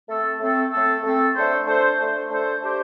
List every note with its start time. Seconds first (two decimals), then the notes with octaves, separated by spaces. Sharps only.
0.09 A3 C4 A4
0.40 A3 C4 A4
0.72 A3 C4 A4
1.03 A3 C4 A4
1.36 A3 D4 A4 C5
1.67 A3 D4 A4 C5
1.97 A3 D4 A4 C5
2.30 A3 D4 A4 C5
2.61 A3 D4 G4 C5